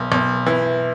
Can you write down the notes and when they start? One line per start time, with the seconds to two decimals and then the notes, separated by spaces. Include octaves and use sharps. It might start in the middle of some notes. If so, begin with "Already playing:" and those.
Already playing: B1
0.12 B1
0.46 E3